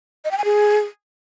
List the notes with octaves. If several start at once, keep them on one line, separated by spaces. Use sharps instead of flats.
D#5
G5
G#5
G#4